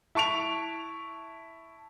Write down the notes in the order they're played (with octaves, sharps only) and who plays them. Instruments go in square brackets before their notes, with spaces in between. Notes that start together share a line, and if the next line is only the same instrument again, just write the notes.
[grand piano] E4 A5 C#6 D7 F7